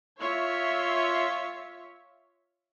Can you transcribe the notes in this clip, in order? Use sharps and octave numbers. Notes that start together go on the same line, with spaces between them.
F4 C#5 E5